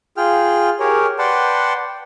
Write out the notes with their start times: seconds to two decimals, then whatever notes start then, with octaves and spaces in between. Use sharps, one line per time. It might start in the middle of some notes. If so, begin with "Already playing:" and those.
0.17 F4 G#4 G5 F6
0.79 G4 G#4 A#4 C#5
1.19 B4 D5 F#5 G5 A5 C6